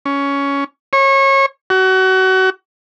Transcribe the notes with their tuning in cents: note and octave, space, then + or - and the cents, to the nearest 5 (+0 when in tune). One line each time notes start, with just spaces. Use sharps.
C#4 +15
C#5 -25
F#4 +30